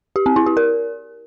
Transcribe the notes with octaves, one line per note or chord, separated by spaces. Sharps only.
G4
C4
E4
G4
A#4